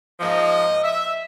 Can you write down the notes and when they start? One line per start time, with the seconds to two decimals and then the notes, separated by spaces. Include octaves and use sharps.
0.20 G#2 F3 A#3 D#5
0.83 E5